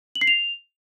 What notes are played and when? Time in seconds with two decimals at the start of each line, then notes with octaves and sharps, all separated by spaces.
0.15 F#7
0.21 C7
0.27 F7